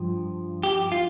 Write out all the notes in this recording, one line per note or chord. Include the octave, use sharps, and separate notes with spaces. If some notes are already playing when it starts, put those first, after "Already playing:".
Already playing: G2 F3
G4
F4